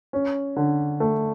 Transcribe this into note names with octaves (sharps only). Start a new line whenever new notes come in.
C#4
D3
A3